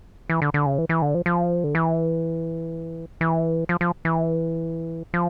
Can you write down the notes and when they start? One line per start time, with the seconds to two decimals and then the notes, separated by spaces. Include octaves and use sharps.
0.30 E3
0.42 D3
0.54 D3
0.66 C#3
0.78 E3
0.89 E3
1.02 D3
1.15 F3
1.26 F3
1.64 D3
1.75 E3
3.21 E3
3.69 F3
3.81 F3
4.05 E3
5.14 F3